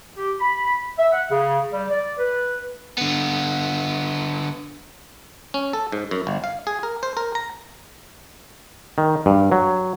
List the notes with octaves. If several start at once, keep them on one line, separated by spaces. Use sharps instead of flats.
G4
B5
E5
F#5
C#3
G3
D5
B4
D3 B3
C#4
A4
G#2
F#2
G1
F5
G#4
A#4
C5
A#4
A#5
D#3
G2
F#3